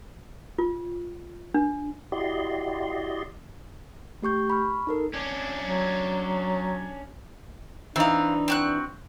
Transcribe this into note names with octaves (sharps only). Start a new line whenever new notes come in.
F4
D4
E4 F#4 G4 D5 D#5 C6
A3 G4 C#6 G6
B5 C#6 F6
D#4 A4 A#4
C#4 D4
F#3
E3 C4 D4 D#4 F5
C4 F#4 F#6